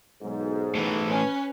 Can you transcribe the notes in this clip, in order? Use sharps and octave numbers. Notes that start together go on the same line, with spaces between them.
B1 G#2
A2 E3
C#4 B4